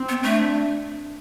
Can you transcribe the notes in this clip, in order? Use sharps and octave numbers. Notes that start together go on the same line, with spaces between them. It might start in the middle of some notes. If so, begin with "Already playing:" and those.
Already playing: C4
B3
A3 D4